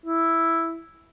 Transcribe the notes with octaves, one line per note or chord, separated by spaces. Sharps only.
E4